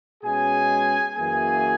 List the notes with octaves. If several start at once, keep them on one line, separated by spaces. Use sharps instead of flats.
B2 G#3 C#4 G#4 G#5
F#2 E3 A#3 G#4 G#5